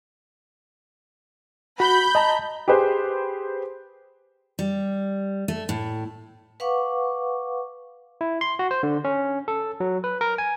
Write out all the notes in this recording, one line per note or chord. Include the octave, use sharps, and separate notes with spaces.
F#4 B5 G6
D#5 A5 A#5
G4 G#4 B4 C5
G3
A3
A2
B4 F5 F#5 C#6 D6
E4
C6
F#4
C5
D3
C#4
A4
F#3
B4
A#4
G#5